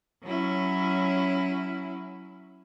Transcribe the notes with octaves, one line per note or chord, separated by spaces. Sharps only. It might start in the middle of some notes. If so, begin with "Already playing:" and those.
F#3 C#4 E4